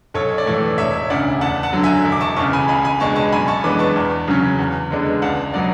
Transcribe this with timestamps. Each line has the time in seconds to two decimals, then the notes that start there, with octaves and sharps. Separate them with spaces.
0.14 B1 A4 C#5
0.38 D5
0.46 A2 E3 A4 C#5
0.78 E1 C#5 E5
1.10 D2 C#3 D5 F#5
1.41 E2 F#5 A5
1.63 F#5 A5
1.73 D3 F#3
1.83 E5 G#5
2.05 E1
2.12 D6
2.21 A5 C#6
2.36 E2 C#3 A5 C#6
2.53 G#5 B5
2.68 C#2 G#5 B5
2.85 G#5 B5
3.00 B2 G#3 D4 A5 C#6
3.16 A5 C#6
3.32 F#2 G#5 B5
3.48 A5 C#6
3.64 E3 G#3 B3 D4 B5 D6
3.79 A5 C#6
3.96 E2
4.28 C#3 F#3 C#4
4.59 E2
4.91 D3 G#3 B3 D4
5.22 C#2 F#5 A5
5.53 B2 F#3 B3 D5 F#5